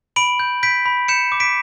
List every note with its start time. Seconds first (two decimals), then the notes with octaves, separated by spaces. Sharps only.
0.16 B5 D7 F#7
0.40 G6
0.63 G6 B6 D7
0.86 B5
1.08 G6 C#7 E7
1.32 D6
1.40 B6 D7